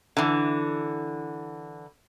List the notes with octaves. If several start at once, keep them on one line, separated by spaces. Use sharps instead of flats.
D3 E3